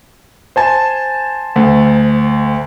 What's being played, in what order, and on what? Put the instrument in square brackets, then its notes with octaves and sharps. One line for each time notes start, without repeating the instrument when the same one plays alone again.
[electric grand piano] C5 G#5 A5
[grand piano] D2